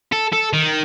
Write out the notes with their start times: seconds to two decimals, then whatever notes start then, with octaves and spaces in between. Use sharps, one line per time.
0.12 A4
0.33 A4
0.53 D#3